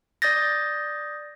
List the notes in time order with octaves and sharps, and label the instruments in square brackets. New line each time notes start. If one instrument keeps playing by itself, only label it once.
[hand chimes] D5 D#6 G6 A6 A#6